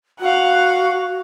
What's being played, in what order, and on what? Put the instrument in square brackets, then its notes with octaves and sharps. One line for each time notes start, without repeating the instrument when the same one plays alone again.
[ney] F#4 [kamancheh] F5 F#5